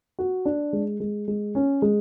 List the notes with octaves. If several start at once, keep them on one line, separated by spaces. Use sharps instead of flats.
F#4
D4
G#3
G#3
G#3
C#4
G#3